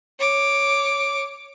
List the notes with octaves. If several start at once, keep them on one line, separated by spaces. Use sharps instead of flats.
C#5 D6